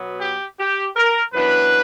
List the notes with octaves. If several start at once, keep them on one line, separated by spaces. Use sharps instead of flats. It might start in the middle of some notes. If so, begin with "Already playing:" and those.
Already playing: B2 F#3 B3
G4
G4
A#4
F#2 E3 B3 D4 B4